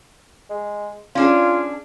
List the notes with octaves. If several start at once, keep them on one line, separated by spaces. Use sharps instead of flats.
G#3
C#4 D4 F4 G#4